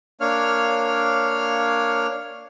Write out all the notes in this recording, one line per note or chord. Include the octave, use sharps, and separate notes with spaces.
A#3 D4 C#5 F5 F6